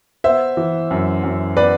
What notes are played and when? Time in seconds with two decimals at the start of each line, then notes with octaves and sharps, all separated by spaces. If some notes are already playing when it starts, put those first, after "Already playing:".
0.24 B3 C5 E5
0.57 E3
0.91 F#2
1.23 F#2
1.57 B3 B4 D5